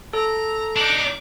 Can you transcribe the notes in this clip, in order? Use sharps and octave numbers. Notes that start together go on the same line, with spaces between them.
A4 A#5
D4 D#4 D6